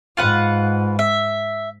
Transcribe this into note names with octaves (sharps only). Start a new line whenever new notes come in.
G#2 F4 B4 F#5
E5